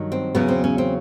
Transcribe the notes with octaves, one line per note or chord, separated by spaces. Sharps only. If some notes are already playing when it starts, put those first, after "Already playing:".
Already playing: G2 D#3 F#3
C4
E2 C#3 F#3 B3
C4
C#4
C4